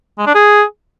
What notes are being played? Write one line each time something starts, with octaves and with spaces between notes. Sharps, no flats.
G#3
D4
G#4